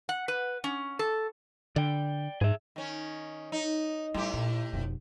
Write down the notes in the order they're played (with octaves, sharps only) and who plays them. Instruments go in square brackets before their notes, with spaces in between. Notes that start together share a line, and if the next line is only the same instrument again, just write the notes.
[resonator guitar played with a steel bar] F#5
B4
C#4
A4
[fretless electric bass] D3 [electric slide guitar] D5 G5
[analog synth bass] G#2 [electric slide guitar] G#4 E5
[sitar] D#3 C#4
D#4
[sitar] A2 G4 [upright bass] G3
[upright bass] A#2
F1 B2